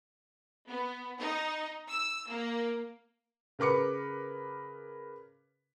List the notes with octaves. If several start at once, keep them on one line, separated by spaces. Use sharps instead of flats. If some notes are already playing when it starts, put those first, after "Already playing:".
B3
D#4
E6
A#3
C#3 A#4 B4 D6 C#7